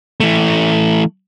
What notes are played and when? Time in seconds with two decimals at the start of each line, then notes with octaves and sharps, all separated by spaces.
0.20 E3 A3